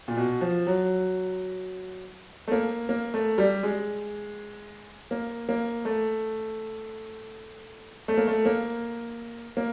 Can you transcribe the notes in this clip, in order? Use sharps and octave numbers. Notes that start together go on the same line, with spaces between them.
A#2
B2
F3
F#3
A3
A#3
A#3
A3
G3
G#3
A#3
A#3
A3
A3
A#3
A3
A#3
A#3